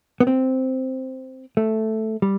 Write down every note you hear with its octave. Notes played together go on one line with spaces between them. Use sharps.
B3
C4
A3
G3